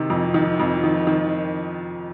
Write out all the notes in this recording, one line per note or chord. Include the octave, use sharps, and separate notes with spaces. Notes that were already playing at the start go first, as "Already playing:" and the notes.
Already playing: C3 D#3
F2
D#3
F2
D#3
D#3